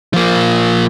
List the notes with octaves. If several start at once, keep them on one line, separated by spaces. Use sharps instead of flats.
F3 A#3